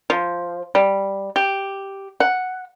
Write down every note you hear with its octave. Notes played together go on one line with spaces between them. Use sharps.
F3
G3
G4
F#5